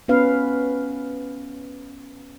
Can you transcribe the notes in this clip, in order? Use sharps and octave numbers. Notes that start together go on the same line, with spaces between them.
B3 C#4 B4 F5